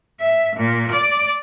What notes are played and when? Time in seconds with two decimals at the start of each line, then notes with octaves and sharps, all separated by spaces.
0.20 E5
0.57 A#2
0.92 D5